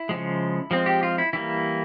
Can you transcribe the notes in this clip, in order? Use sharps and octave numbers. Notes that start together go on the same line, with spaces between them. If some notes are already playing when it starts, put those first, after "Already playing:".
Already playing: E4
C#3 F3 G#3
F3 G#3 C4
G4
F4
E4
E3 G3 A#3 E4